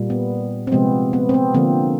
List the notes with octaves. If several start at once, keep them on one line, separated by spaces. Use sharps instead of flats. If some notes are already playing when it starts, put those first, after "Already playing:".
Already playing: A#2 G3 A#3
B3
C4
C3 F3 G#3 B3
B3
C4
B3
D3 F3 A#3 C4